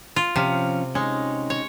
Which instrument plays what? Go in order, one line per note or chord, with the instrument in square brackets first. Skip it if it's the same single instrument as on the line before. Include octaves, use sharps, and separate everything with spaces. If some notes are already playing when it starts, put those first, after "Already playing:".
[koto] F4
[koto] C3 [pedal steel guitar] F3 C#4 F5
[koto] G#3 [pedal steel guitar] C#4 D#4
[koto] C#5